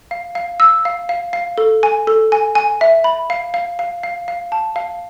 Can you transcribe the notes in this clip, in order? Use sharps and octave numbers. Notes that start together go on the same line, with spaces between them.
F5
F5
E6
F5
F5
F5
A4
G#5
A4
G#5
G#5
E5
B5
F5
F5
F5
F5
F5
A5
F5